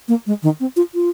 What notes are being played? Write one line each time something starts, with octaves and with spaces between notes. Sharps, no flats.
A#3
G#3
D#3
C4
F4
F4